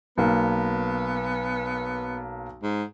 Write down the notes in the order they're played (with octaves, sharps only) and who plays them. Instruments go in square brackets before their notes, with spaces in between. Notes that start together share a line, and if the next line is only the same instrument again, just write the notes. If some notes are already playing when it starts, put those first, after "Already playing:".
[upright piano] B1 A#3 [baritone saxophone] B3
[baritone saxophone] G#2